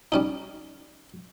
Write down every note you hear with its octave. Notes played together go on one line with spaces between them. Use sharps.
G3 C#4 D#4